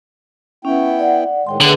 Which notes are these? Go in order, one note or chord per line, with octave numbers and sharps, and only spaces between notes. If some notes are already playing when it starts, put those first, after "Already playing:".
B3 C#4 E4 G5
D5 F#5
A2 D#3 G#3 C#5 G5 C6
D3 A3 B3 G#4 B4